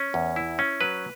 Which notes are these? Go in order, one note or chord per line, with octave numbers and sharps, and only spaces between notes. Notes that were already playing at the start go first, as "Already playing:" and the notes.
Already playing: C#4
E2
E4
C#4
F#3 B4